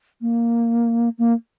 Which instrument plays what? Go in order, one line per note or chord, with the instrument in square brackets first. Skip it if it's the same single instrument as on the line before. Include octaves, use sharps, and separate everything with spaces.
[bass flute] A#3
A#3